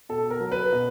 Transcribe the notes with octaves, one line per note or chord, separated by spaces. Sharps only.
B2 A4
A#4
F#3
B4
B2